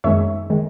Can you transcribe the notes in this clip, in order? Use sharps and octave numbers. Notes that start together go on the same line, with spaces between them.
F#2 D#3 G#3 C#5 E5
D#3 G#3